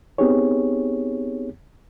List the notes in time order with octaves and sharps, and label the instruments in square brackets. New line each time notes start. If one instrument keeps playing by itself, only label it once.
[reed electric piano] B3 C4 D#4 G4 G#4 C#5